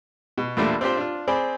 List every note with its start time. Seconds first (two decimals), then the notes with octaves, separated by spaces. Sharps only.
0.38 B2
0.57 E2 A#2 G3 A3 A#3 D4
0.81 C4 D4 F4 G4 C5
0.97 D4 F4
1.28 C4 G#4 C5 D5 B5